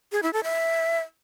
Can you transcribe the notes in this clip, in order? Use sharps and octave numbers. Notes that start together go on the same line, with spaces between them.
G#4
E4
A4
E5